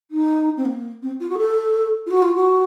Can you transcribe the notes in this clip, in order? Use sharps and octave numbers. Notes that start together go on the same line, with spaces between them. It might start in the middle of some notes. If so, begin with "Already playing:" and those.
D#4
C4
A#3
C4
F4
F#4
A4
F4
F#4
F4
F#4